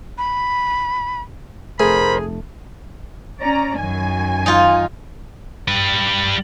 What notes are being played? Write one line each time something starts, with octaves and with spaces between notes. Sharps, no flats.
B5
F1 A3 G#4 A#4 C5 B5
C#4 D5 A#5
F#2 D#3 G#5
D#4 F4
G3 B4